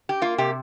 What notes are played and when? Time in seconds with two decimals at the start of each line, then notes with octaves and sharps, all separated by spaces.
0.09 G4
0.22 A#3 F4
0.38 C3 G4